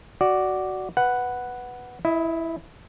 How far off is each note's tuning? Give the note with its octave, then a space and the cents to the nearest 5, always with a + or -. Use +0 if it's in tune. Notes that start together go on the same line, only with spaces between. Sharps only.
F#4 +10 D5 +0
B4 +0 F#5 +0
E4 +0 D#5 +35